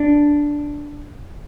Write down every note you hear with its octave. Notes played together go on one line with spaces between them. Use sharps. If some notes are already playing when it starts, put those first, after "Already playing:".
Already playing: D4